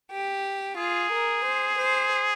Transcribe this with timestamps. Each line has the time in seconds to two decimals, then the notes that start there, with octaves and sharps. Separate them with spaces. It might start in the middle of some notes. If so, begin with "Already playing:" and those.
0.11 G4
0.77 F4 G#4
1.12 A#4
1.45 C5
1.78 C5